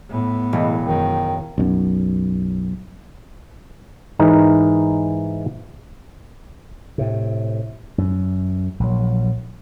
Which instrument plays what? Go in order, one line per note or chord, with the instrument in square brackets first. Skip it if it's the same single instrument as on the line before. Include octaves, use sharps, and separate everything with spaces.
[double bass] A2 B3
[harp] E1
[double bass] F#2 [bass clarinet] D#3
[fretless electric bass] B1 F#2
[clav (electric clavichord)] G#2 E3 D#4 A#4
[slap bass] A2 C3
F#2
A#1 F#3